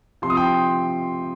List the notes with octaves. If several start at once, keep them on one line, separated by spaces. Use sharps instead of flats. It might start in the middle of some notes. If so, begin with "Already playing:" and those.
C3 F3 C6
D#6
G5 C6